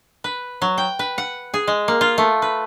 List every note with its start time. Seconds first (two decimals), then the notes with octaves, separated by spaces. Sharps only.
0.24 B4
0.62 F#3
0.78 G5
0.99 B4
1.18 F#5
1.54 G#4
1.67 G#3
1.88 A#3
2.01 F4
2.18 A3
2.42 B4